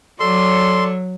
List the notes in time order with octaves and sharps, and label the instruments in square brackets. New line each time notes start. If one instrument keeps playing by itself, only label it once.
[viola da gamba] F#3 C#5 [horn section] A4 D5 [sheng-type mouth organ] C6